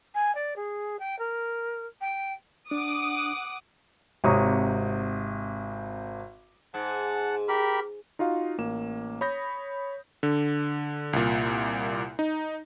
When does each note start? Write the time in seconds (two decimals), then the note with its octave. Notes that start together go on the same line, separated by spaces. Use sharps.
0.14 G#5
0.35 D5
0.56 G#4
0.99 G5
1.19 A#4
2.01 G5
2.71 D4 F#5 D6 D#6
4.24 G#1 C3 C#5 A#5 C#6 D#6
6.74 G#2 F#5 A5
7.48 G4 A#4 B5
8.19 D#4 F4 F#4 F5
8.58 A1 A#3 E7
9.21 C#5 B5 D#6 G6 A#6
10.23 D3
11.13 C2 A#2
12.19 D#4